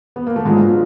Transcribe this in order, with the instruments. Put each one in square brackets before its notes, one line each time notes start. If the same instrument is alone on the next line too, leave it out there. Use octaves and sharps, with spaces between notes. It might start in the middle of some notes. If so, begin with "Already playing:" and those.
[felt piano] B3
A#3
A3
[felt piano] G#2 G#3 [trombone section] F#3 B3 D4 F4